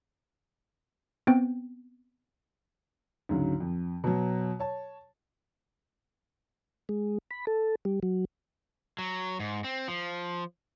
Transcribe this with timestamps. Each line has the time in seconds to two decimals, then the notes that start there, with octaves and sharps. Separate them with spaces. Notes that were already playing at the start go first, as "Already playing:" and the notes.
1.27 B3 C4 G5
3.29 D2 G#2 C#3 F#3
3.60 F2
4.04 B2 F#3
4.60 C#5 A5
6.89 G#3
7.31 B5
7.47 A4
7.85 G3
8.03 F#3
8.98 F#3
9.40 G#2
9.64 C4
9.88 F3